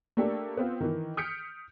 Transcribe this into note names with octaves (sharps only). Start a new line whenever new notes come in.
A3 A#3 D4 G4 A4
B3 C4 F4
D#3 E3
D#6 F6 G6 B6 C#7 D7